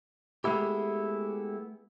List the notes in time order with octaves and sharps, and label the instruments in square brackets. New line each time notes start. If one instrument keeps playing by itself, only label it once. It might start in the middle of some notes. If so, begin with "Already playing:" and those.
[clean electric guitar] G#3 A3 B3 E4 G4